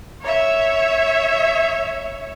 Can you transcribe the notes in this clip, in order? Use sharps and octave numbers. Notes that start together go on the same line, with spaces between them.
C#5 E5